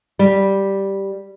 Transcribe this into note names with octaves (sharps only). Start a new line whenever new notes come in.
G3